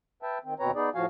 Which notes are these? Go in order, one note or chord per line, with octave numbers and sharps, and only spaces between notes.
B4 E5 G5 A5
D#3 C4
D#2 B2 C4 B4 C#5 A#5
B3 D#4 G#4 D5
A2 F3 F#4 F5 G#5